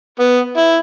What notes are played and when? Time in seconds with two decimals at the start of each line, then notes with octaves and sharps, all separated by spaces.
0.20 B3
0.57 E4